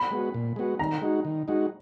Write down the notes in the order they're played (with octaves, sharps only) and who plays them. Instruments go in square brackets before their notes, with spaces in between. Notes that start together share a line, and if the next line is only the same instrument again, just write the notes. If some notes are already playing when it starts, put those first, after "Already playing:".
Already playing: [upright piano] B5
[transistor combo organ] G#3 B3 F#4
A#2
G#3 B3 F#4
[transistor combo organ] D#3 [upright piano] A#5
[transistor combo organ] G#3 D#4 F#4
D#3
G#3 D#4 F#4